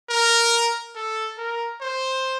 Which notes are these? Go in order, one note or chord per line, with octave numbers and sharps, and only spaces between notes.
A#4
A4
A#4
C5